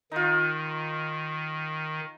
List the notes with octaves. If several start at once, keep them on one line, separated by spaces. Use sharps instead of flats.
D#3 D#4 F4